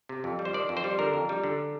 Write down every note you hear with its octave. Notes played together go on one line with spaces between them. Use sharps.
C3
F2
G3
C5
D#3 D5
F2
C5
G3
D3 A#4
F2
G3
D3